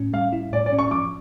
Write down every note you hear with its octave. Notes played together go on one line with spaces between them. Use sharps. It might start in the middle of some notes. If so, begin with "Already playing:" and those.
Already playing: A2 C#4
G3 F5
E4
A2 D5
D5
C#4
C#6
F3 D6